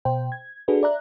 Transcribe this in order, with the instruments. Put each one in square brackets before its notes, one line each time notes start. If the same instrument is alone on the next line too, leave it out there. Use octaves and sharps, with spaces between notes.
[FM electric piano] B2 C5 G5
G#6
D4 F#4 G#4 A4 B4
D5 E5 A#5 F#6